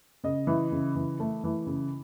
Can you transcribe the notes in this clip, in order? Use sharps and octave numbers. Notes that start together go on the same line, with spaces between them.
C#3 D#5
E3
C#3
E3
A3
E3
C#3